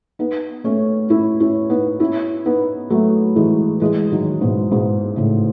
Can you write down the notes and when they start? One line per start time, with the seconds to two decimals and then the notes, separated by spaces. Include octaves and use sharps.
0.19 B3 D#4
0.64 A3 C#4
1.10 C#4 E4
1.40 C#4 E4
1.70 B3 D#4
2.00 C#4 E4
2.46 B3 D#4
2.90 F#3 A3
3.36 E3 G#3
3.81 E3 G#3
4.12 D#3 F#3
4.41 G#2 B2
4.71 G#2 B2
5.16 A2 C#3